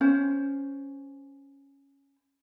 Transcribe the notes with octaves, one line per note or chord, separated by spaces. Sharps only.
C#4 C5